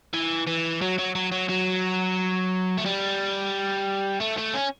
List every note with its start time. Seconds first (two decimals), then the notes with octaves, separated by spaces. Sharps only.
0.14 E3
0.47 E3
0.82 F#3
0.99 F#3
1.15 F#3
1.32 F#3
1.49 F#3
2.78 A3
2.85 G3
4.21 A3
4.38 A3
4.55 C#4